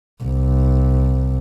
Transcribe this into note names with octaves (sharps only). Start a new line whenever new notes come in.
C2